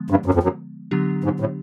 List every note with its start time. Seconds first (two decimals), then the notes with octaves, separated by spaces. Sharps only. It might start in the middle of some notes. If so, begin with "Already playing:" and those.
Already playing: D3 F3 G#3 B3
0.10 G2
0.26 F#2
0.34 F2
0.43 F#2
0.91 D3 F#3 B3 D4 G4
1.24 G#2
1.40 A2